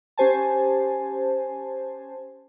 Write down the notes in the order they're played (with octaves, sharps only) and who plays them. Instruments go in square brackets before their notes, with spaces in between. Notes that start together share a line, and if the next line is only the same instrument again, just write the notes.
[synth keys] C#4 G4 C5 G#5 A5